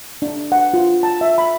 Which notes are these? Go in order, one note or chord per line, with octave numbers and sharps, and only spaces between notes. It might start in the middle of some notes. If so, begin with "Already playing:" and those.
D4
F#5
F4
A5
E5
B5